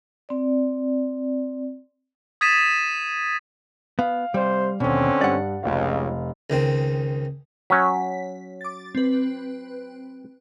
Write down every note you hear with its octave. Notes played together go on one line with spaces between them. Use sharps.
C4 D5
D#6 G#6 A6 B6 D#7 E7
B3 F5
C3 G3 C5
D#2 B2 D3 C4 C#4
G2 D5 F#5
F1 C#2 F5
C#2 D#3 C4
F#3 C#4 B6
D6 A6
C4 B4